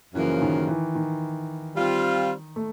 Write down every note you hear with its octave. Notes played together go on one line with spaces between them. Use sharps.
F#2 C#3 E3 F3 A#3
D#3
E3
D#3
G3 C4 F4
A3